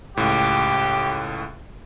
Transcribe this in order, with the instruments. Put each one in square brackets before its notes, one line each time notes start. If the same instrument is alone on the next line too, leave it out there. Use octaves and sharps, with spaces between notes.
[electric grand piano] C#2 A2 [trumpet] G4